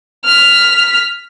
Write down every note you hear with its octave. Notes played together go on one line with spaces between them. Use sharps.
F6 B6